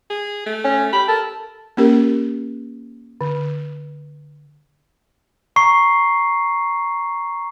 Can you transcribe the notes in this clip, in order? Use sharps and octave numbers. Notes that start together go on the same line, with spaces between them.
G#4
A3
C#4
G4 B5
A4 A#4
A#3 C#4 G4 A#4
D3
A#5 C#6 C7